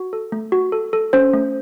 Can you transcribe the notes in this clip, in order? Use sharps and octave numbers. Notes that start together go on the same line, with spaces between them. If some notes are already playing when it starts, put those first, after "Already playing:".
Already playing: F#4
A4
A3
F#4
A4
A4
C#4 C5
A3